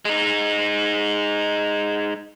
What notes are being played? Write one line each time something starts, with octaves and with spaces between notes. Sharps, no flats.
G#3 D#4